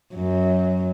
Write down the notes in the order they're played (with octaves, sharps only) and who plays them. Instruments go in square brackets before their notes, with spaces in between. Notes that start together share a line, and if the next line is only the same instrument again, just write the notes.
[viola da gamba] F#2